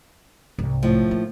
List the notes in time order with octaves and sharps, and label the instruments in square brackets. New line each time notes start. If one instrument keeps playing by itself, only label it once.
[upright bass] C2 G#2
[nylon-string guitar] A2 F3
[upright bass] D3 A#3